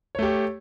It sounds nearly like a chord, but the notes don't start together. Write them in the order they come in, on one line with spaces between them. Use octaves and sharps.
C#5 A3 G4